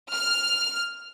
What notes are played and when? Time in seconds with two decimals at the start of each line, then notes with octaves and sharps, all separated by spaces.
0.13 F6